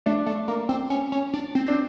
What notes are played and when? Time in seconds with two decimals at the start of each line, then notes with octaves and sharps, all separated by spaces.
0.06 A3 D4
0.26 A3
0.48 A#3
0.69 C4
0.90 C#4
1.12 C#4
1.34 D4
1.55 C4
1.67 C4 D4